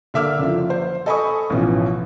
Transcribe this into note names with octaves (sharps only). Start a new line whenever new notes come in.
D3 A#3 E5 D6 E6 F6
F#1 F3
C5
A4 D#5 G#5 B5 C#6 D#6
A1 B2 E3 F3